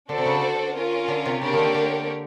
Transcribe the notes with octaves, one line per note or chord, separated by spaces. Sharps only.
D3 D4 F#4 A4 C5
C3
C#3
D3
C#4 F4 A#4
D3
C3
C#3 A#3 D4 G4 A#4 C#5
D3 D#3
D3